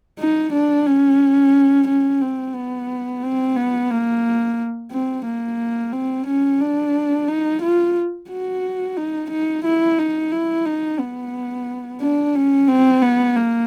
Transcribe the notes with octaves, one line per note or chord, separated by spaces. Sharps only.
D#4
D4
C#4
C#4
C4
B3
C4
B3
A#3
C4
A#3
C4
C#4
D4
D#4
F4
F#4
D#4
D#4
E4
D#4
E4
D#4
B3
D4
C#4
C4
B3
A#3